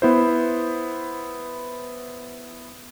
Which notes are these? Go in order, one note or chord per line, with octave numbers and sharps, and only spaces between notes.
B3 E4 C5